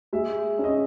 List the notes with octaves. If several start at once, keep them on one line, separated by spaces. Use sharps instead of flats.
G#3 E5
C#4
D#5